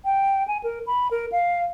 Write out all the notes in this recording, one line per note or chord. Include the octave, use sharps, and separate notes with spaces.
G5
G#5
A#4
B5
A#4
F5